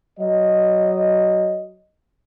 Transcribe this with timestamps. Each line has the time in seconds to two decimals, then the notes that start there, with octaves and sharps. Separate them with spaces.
0.20 F#3 D#5